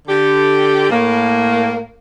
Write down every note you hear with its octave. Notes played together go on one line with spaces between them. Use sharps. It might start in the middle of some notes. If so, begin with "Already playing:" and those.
D3 G4
A2 A#3